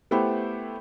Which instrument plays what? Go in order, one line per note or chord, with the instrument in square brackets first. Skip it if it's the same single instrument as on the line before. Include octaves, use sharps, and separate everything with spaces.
[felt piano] A3 B3 E4 G4 C5